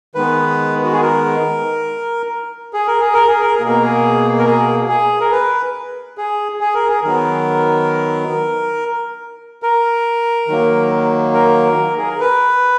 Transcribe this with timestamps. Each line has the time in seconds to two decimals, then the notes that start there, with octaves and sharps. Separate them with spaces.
0.15 D#3 G#3 B3 B4
0.84 F#4
0.93 G#4
1.02 A#4
2.73 G#4
2.87 A#4
3.01 G#4
3.14 A#4
3.28 G#4
3.41 A#4
3.55 G#4
3.60 B2 A#3
3.69 A#4
3.82 G#4
4.39 A#4
4.46 G#4
4.89 G#4
5.21 A#4
5.32 B4
6.18 G#4
6.61 G#4
6.74 A#4
6.89 G#4
7.03 D#3 F#3 B3 A#4
9.63 A#4
10.48 D#3 F#3 A#3
11.34 A#4
11.98 G#4
12.09 A#4
12.20 B4